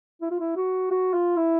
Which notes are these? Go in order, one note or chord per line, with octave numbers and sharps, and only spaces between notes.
E4
F4
E4
F#4
F#4
F4
E4